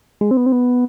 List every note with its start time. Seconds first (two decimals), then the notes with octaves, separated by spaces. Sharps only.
0.21 G#3
0.31 C4
0.37 B3
0.46 C4
0.52 B3